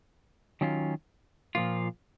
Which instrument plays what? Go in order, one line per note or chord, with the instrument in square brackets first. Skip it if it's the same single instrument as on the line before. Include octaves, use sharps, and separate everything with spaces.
[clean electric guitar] D#3 F#3 C#4 F4
A#2 F3 A#3 F4